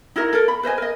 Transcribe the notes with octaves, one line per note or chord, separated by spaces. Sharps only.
D#4 E4 F#4 A#4
A4 A#4
B5
B4 C5 D#5 G#5
A#4 D#5